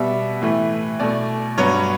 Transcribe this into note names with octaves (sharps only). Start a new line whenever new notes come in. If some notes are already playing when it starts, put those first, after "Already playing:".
Already playing: B2 G3 B3 E5
A2 E3 A3
B2 A3 D5
G2 F#3 B3 C#5